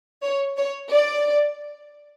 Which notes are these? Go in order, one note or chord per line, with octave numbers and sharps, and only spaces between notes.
C#5
C#5
D5